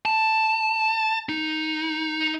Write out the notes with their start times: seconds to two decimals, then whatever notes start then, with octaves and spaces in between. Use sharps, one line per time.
0.05 A5
1.29 D#4